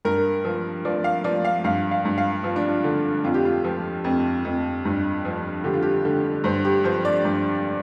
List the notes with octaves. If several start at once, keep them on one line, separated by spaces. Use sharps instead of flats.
G2 A#4
F3
F3 D5
F5
F3 D5
F5
G2 F5
F5
G2
F5
F3 F4
D4
F4
D3
F2 F4
G4
F4
F3
F2
F2
G2
F3
D3 G4
F4
G4
D3
G2 C5
G4
F3 C5
D5
G2